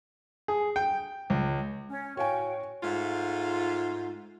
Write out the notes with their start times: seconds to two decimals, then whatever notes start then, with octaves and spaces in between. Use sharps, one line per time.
0.48 G#4
0.76 G5
1.30 C#2
1.90 C#4
2.17 A2 F#4 C#5 F5 G5 G#5
2.83 G#2 A3 F4